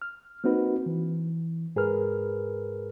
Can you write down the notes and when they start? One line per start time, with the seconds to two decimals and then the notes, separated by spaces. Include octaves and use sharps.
0.02 F6
0.44 A#3 C4 D#4 F#4 B4
0.86 E3
1.76 G#2 G#4 A#4 B4 F6